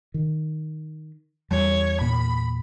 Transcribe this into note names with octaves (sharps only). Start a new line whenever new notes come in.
D#3
E2 G3 C#5
A#2 B5